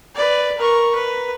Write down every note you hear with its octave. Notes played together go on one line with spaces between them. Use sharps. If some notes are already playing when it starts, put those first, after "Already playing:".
B4 D5
A#4 C#6
B4